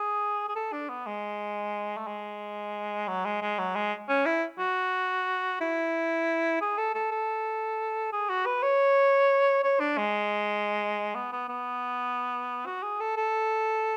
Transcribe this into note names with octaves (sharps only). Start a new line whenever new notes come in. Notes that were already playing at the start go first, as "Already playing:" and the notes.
Already playing: G#4
G#4
A4
D4
B3
G#3
A3
G#3
F#3
G#3
G#3
F#3
G#3
C#4
E4
F#4
E4
G#4
A4
A4
A4
G#4
F#4
B4
C#5
C#5
D4
G#3
B3
B3
B3
F#4
G#4
A4
A4